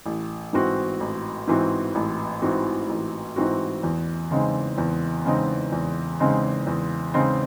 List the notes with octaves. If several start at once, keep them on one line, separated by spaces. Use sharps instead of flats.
A1
G#2 E3 C4 F#4
A1
G#2 E3 C4 F#4
A1
G#2 E3 C4 F#4
A1
G#2 E3 C4 F#4
E2
C#3 G#3 C4 D#4
E2
C#3 G#3 C4 D#4
E2
C#3 G#3 C4 D#4
E2
C#3 G#3 C4 D#4